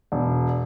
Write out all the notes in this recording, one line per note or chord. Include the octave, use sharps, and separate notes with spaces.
E1